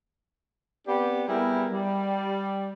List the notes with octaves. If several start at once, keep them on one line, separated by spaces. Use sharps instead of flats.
B3 C4 D4 G4
G3 B3 E4 G#4 A#4
G3